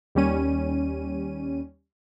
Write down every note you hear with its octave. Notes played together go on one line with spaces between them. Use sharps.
D#2 G3 C#4 D#7